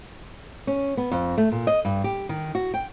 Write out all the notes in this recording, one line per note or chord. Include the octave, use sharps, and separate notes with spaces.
C#4
B3
F2
A3
A#2
D#5
G2
G4
D#3
F#4
G5